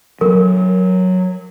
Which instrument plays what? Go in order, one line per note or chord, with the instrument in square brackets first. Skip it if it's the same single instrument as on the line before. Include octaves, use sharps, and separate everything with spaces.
[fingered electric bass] F#3 D4 [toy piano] A#4